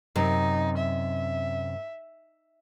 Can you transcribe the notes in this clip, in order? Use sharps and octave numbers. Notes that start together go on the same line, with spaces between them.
F#2 C3 C4 D#4
E5